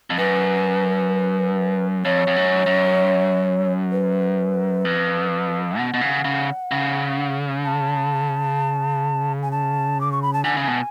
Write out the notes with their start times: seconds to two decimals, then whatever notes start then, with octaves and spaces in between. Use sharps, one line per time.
0.10 F2
0.18 F#2 B4
2.05 F2 C#5
2.27 F2
2.36 F#2
2.66 F#2
3.91 B4
4.85 F2
5.78 B2 F#5
5.94 B2
6.01 C#3
6.25 C#3
6.71 C#3
7.64 A5
9.42 G#5
9.51 A5
10.01 D6
10.12 C#6
10.22 B5
10.33 A5
10.44 D3 G#5
10.57 C#3
10.68 B2